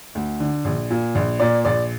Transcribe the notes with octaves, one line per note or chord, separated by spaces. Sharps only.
D2
D3
A#1
A#2
A#1
A#2 D5
A#1 D5